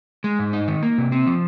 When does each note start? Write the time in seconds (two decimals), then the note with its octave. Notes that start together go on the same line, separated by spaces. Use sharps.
0.24 G#3
0.39 G#2
0.53 D#4
0.68 D#3
0.83 A#3
0.98 C3
1.12 C4
1.27 F3